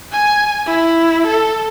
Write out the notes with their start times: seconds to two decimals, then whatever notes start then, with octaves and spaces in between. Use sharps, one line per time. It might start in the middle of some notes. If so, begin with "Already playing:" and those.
0.12 G#5
0.66 E4
1.27 A4